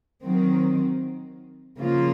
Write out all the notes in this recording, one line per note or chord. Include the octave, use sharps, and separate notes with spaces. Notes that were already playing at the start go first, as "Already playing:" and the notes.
D#3 F#3 C4
C#3 F3 A#3 F4